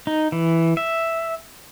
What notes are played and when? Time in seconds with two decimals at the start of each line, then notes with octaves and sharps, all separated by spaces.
0.07 D#4
0.32 E3
0.77 E5